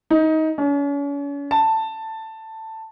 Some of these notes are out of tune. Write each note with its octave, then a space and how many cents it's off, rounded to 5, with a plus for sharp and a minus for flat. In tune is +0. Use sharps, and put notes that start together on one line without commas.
D#4 +20
C#4 +40
A5 +10